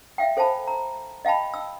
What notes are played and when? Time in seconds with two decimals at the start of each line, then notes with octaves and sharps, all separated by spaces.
0.18 E5 F5 G5
0.37 A4 C5 F5 G#5 A5 B5
0.68 A#5
1.25 D#5 F5 G5 A5 B5
1.54 E6